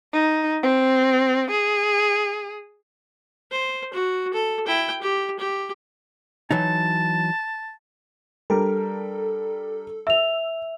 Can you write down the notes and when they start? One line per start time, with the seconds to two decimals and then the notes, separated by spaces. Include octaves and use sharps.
0.13 D#4
0.63 C4
1.51 G#4
3.51 C5
3.93 F#4
4.33 A4
4.67 E4 G5
5.02 G4
5.39 G4
6.51 E3 F#3 D#4 A5
8.50 G3 D4 A4 A#4
10.07 E5 E6 F7